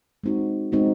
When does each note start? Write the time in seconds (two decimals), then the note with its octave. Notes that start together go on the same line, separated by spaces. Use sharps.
0.24 G#3 C4 D#4 F#4
0.72 G#3 C4 D#4 F#4